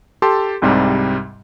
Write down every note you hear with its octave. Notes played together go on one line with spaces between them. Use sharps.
G4 A4 A5 C6
C2 G#2 C3 G3